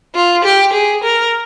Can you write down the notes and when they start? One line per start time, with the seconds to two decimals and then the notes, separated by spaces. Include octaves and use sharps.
0.15 F4
0.44 G4
0.73 G#4
1.04 A#4